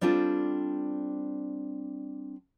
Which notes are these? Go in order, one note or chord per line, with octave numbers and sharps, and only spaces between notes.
G3 C4 D4 F4 A4